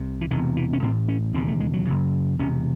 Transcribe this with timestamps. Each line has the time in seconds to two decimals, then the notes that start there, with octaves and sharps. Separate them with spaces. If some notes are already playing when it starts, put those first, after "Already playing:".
Already playing: C2 C3
0.21 E3
0.31 E1 E2 C3 D#3
0.57 E3
0.73 C#4
0.82 A1 A2 C4
1.08 C#4
1.34 E1 D#2 C#3 C4
1.48 A3
1.60 G#3
1.73 F#3
1.87 F#1 F#2 C#3
2.39 E1 E2 C3 C#4